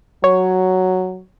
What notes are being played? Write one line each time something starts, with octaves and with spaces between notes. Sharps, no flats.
F#3 C#5